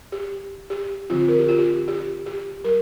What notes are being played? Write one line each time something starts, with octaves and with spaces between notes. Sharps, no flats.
G4
G4
D3 F3 C4 F4
A#4
G4
F4
G4
G4
G4
G3 A#4